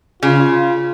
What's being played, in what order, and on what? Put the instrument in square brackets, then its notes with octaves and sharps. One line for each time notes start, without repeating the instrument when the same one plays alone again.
[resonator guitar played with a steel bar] C#3 [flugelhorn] F4